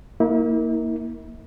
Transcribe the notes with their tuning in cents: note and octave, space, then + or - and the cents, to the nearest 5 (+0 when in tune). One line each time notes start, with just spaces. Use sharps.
A#3 +0 E4 -40